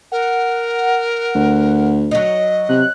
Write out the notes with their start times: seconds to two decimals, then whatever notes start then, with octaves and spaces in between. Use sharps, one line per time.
0.12 A#4 F#5
1.35 D2
2.11 F#3 D#4 D#5
2.69 C3 F#6